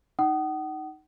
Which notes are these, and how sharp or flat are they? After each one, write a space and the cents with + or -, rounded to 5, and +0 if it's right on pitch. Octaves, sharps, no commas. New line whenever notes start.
D#4 +0 F#5 +40 D#6 -10